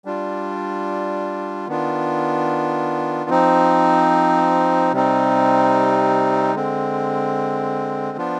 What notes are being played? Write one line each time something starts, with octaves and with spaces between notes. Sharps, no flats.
G3 D4 F4
D#3 B3 D4 F4
F3 C4 D#4
C3 G3 C4 D#4
D3 G#3 C4
F3 B3 D4 F4